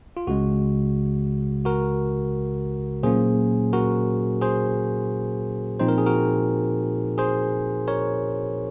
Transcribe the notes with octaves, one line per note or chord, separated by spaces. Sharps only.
F4
C#2 C#3 G#3 F#4
F#4 A#4
A#2 F#3 A#3 C#4 G#4 C5
F#4 A#4
G#4 C5
A#2 F3 C4 D#4 C5
A#4
G#4
F#4 A#4
G#4 C5
A#4 C#5